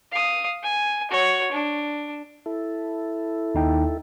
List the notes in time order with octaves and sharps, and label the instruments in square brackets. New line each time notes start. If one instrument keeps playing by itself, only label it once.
[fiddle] F5 D#6
G#5
F#4 C#5
D4
[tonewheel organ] E4 A4
[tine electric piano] D#2 D#4 G5